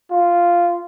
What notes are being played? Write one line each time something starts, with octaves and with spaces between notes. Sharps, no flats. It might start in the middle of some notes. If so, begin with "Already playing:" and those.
F4